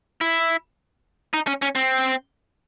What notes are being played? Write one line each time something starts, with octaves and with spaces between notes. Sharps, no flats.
E4
D#4
C#4
C#4
C4